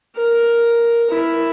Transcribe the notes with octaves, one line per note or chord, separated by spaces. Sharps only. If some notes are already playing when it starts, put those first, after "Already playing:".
A#4
E4